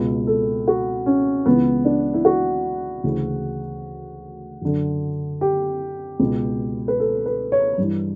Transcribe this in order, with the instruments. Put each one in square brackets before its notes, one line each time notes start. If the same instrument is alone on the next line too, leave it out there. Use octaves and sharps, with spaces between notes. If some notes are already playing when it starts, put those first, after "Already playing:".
Already playing: [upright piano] C#2 B2
A4
F#4
C#4
C#2 C#3 E3 B3
D4
E4
F#4
D2 C#3 E3
F#2 D3
G4
C#2 B2
B4
A4
B4
C#5
G2 E3